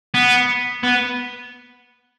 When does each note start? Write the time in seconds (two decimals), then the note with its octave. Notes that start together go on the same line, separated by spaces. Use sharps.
0.14 B3
0.83 B3